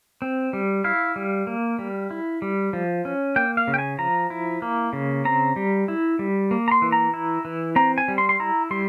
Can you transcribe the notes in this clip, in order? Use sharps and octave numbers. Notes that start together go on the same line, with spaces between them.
C4
G3
E4 F5
G3
A#3
G3
E4
G3
F3
C#4
A#3 G5
F5
C#3
G5
G#5
F3 A#5
E4
A#3
C#3
C4 A#5
G3
E4
G3
A#3
A#5
C6
E3
A#5
E4
E3
C4 A#5
G#5
G3
C6
C6
E4 A#5
G3 C6